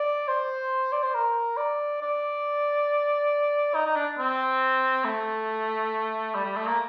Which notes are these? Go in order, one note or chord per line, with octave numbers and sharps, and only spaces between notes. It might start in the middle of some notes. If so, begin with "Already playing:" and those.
Already playing: D5
C5
D5
C5
A#4
D5
D5
D#4
D#4
D4
C4
A3
G3
G3
A3
A#3